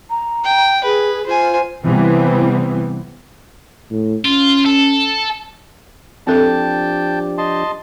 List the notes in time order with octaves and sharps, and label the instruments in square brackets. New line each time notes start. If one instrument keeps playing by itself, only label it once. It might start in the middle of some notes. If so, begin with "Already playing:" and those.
[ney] A#5
[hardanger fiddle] G5
[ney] G#4 [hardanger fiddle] B4
[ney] F4 [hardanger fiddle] C5 G#5
[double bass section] C3 E3 G3 B3 C4
[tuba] A2
[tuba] C#4 [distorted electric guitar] F4
[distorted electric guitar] A4
[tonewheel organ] F3 D4 G4 [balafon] C4 A4 [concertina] G5 A5
[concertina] D#5 A5 C6